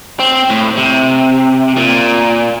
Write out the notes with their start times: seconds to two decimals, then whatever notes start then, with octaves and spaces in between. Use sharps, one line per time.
0.20 C4
0.50 A2
0.77 C3
1.77 A#2